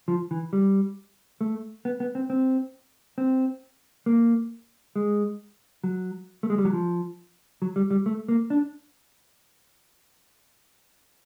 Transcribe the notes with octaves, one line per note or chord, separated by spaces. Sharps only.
F3
E3
G3
A3
B3
B3
C4
C4
C4
A#3
G#3
F#3
A3
G#3
G3
F#3
F3
F#3
G3
G3
A3
A#3
D4